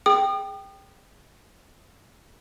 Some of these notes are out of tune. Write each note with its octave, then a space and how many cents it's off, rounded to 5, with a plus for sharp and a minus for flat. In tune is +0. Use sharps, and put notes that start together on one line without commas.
G#4 +0 G5 +0 D#6 -40